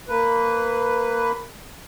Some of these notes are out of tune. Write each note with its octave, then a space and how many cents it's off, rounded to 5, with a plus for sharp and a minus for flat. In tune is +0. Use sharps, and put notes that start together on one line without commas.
A#3 -15 B4 +5